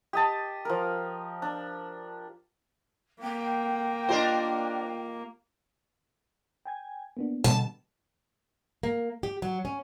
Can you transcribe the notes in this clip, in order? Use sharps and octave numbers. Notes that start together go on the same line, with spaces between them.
G4 D#5 A5
F3 A#4
D4
A#3 G5
D4 F4 G4 A#4 C5 D#5
G5 G#5 G#6
A#3 B3 D4
B2 D3 G3 A5
A#3
G4
F#3
C#4